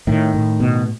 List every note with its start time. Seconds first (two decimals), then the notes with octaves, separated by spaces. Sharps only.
0.07 A2 D#3
0.34 A2
0.60 B2